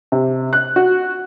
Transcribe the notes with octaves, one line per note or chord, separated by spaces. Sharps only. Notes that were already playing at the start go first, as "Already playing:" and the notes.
C3
F#6
F#4